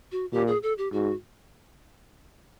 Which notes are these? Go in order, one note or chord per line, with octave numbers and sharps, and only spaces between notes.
F#4
A#2 G4
G#4
A4
G4
G#2 F#4